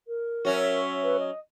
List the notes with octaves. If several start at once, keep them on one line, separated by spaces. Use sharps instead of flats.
A#4
F#3 C#4 F#4 C#5 E5
B4
D#5